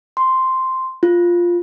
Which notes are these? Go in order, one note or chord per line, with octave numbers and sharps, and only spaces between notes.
C6
F4